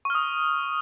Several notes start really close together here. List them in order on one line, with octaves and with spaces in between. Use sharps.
C#6 F6 D#6